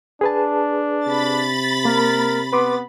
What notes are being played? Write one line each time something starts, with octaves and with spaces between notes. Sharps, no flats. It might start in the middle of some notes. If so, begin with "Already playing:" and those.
D4 G#4 B4 A5
C3 B5 A6
A#3 A#4
B3 B4 C6 D6